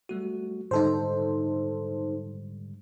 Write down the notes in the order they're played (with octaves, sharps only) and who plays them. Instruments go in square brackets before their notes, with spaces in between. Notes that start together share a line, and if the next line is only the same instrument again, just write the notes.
[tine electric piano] G3 A3 F#4
[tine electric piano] G#2 D3 G3 [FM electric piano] D#4 A4 C5